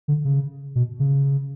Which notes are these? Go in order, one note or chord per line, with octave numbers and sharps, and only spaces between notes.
D3
C#3
B2
C#3